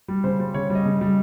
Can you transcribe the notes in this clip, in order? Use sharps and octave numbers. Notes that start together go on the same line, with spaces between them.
G3
C#3 C5
G3
C#3 C#5
G3
D#5
C#3
G3 D#5